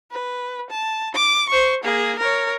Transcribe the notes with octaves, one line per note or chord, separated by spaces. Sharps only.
B4
A5
D6
C5 C#6
A#3 G#4
A#4 C#5